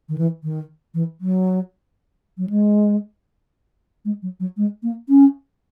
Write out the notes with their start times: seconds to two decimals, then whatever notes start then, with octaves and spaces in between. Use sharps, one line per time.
0.09 D#3
0.18 E3
0.43 D#3
0.94 E3
1.21 F#3
2.38 F#3
2.49 G#3
4.05 G#3
4.22 F#3
4.40 F#3
4.57 G#3
4.83 A#3
5.09 C#4